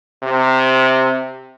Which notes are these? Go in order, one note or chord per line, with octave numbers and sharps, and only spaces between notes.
C3